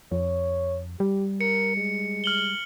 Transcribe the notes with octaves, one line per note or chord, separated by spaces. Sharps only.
F2 C#5
G3 G4
A#4 C#7
G#3
F6 F#7 G7